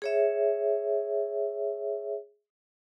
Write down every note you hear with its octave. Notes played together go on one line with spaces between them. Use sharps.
G#4 C#5 E5